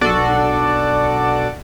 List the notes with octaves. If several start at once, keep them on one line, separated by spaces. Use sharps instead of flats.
B1 D4 F#4 A4 D5